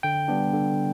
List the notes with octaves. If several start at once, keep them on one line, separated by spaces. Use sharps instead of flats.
D3 G5
G3 B3 D4
D3